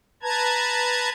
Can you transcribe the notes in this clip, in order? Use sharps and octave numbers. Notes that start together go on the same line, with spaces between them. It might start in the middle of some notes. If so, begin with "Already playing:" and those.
B4 A5 A#5 G#6